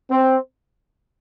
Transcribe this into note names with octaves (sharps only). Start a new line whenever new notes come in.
C4